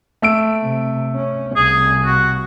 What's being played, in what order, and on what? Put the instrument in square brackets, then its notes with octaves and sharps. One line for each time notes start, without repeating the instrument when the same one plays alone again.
[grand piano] A3 E6 D7
[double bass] C3
C#4
[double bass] C2 [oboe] G#4
[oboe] F#4